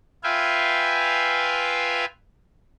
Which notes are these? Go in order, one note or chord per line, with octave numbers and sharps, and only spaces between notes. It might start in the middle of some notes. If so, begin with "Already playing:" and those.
F4 B4 E5 F5 G5 G#5